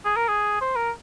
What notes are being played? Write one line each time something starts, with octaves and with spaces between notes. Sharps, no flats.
G#4
A#4
G#4
C5
A#4